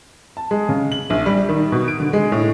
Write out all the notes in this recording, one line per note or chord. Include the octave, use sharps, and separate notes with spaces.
A5
G#3
C#3
F#7
A#1
G3
D#3
B2
D7
D3
G#3
A2